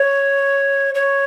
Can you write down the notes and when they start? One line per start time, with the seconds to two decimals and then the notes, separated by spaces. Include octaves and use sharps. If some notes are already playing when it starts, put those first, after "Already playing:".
Already playing: C#5
0.95 C#5